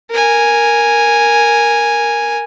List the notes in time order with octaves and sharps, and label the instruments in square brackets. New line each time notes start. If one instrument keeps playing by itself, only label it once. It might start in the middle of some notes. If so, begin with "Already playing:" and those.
[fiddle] A#4 G#5